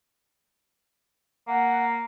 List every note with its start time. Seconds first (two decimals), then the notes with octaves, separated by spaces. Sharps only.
1.48 A#3 F#5